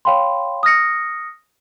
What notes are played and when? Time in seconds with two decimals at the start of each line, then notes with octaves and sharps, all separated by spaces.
0.05 C#5 F5 G5 B5 C6
0.63 D#6 F6 A#6 C#7